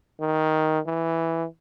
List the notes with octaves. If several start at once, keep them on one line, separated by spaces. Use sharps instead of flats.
D#3
E3